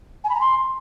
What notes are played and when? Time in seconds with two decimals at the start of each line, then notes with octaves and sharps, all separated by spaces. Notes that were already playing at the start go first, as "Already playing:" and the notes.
0.24 G#5
0.30 B5
0.35 A#5
0.40 C6